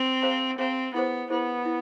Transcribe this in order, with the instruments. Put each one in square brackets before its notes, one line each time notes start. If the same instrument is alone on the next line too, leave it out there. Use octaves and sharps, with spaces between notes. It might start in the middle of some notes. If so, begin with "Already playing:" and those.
Already playing: [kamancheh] C4
[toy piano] G#4 C5 F5 A#5
[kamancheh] C4 [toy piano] G#4 C5 F5 A#5
[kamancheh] B3 [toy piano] E4 G#4 C5
[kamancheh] B3 [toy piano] E4 G#4 C5
[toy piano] E4